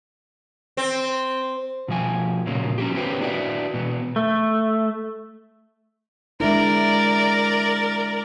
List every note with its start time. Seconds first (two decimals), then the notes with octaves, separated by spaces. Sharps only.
0.77 C4
1.88 B2 F3 G#5
2.47 A#2 C#3 F3 F#3 A#3
2.78 C#4 F#4 G4
2.94 B3 C#4 G4 B4 C5
3.21 D4 E4 F#4 B4 D5
3.74 B2 E3 B3
4.16 A3
6.40 G#3 D4 E4 A#4 D5